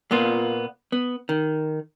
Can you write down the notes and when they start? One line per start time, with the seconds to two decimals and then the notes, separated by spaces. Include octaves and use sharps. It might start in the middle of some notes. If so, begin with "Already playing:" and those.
0.11 A#2 A#3 B3 F4
0.92 B3
1.29 D#3